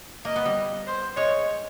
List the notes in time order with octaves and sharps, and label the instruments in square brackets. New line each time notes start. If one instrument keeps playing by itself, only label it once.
[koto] A#3 [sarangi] D#5
[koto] B3
G3
[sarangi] C5
[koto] G#3 [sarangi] C#5